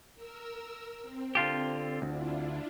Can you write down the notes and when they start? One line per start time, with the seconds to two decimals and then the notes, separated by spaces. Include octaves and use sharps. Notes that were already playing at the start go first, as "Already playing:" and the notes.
0.15 A#4 E6
1.02 C4
1.35 D3 F4 G4
2.02 D2 D4 E4 F4